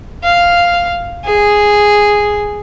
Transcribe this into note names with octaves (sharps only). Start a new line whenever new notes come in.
F5
G#4